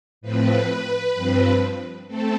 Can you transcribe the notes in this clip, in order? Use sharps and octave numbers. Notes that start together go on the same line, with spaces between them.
A2 F3 C4 B4
G2 F3 C4
A3 C4 A4